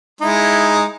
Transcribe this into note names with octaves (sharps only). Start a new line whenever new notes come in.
G#3 D#4 E4